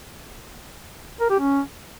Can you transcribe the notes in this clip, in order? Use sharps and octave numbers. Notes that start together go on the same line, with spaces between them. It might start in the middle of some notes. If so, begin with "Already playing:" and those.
A#4
G4
C#4